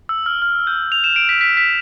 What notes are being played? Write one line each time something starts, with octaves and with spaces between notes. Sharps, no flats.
E6
F6
F6
G6
F7
E7
D7
B6
B6
B6